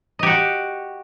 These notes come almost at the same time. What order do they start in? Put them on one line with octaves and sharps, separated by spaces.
D#5 G4 F#4